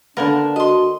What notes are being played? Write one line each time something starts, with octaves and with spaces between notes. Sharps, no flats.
D3 A#3 B3 D4 A#4
F#4 D#5 C6